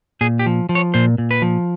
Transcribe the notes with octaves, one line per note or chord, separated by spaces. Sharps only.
A#2 G#4
G4
F3
F3
C#5
A#2 C5
A#2
B4
F3